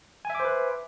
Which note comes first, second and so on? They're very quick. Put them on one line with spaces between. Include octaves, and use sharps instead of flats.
G#5 E5 D6 C5 B4